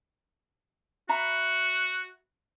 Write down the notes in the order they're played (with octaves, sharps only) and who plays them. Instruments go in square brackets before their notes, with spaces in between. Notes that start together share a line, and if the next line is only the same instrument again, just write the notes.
[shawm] F#4 [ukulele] E5 A#5 B5